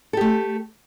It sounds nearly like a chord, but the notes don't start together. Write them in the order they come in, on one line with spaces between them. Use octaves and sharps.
A4 G4 A3